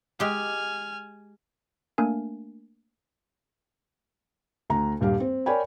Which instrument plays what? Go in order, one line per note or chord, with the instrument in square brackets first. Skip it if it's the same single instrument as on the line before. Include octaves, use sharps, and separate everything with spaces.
[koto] G#3 G4 [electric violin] G#5 F6
[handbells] A3 A#3 D4 A#4 G#5
[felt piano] D2 A#5
D#1 G2 G4 F5
C4
A#4 C#5 D5 G5 G#5 B5